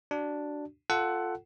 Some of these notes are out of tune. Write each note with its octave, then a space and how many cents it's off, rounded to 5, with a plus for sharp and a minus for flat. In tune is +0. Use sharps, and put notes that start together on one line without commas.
D4 +0 F#4 +20
F4 +0 A4 +0 F#5 +15